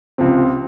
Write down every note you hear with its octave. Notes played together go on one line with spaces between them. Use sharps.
C#2 C3 F3 C4